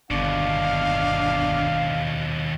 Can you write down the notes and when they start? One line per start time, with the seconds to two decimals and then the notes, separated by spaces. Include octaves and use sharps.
0.11 G1 D#2 B2 D4 F5